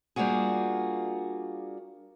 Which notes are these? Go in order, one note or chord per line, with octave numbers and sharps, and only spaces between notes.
G3 A#3 D4 F4 F#4 G#4